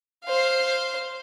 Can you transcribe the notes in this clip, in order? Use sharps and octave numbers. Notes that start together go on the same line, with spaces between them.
C5 F5